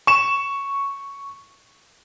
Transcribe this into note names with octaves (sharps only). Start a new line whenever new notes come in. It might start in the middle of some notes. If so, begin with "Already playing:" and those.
C#6 E7